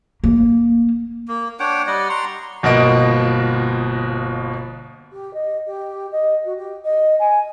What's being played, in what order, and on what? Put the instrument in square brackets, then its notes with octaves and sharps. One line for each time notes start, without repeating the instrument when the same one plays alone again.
[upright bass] A#3
[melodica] A#3
D4 C#5 F#5 G5
G3 D5 D#5 F#5
A#5 C6 C#6
[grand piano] G1 B2 F3 A#3 D#5 D7
[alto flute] G4
D#5
G4
D#5
F#4
G4
D#5
G#5